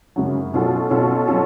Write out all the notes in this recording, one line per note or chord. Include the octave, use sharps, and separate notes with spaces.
F#2 C#3 F#3
B2 F#3 C#4 F4 A4
B2 F#3 C#4 F4 A4
F#3 C#4 F4 A4